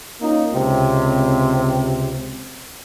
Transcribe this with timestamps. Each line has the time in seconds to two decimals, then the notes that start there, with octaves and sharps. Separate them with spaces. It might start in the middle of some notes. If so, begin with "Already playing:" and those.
0.21 A#3 C#4 D#4 F4
0.53 C#2 C3 C4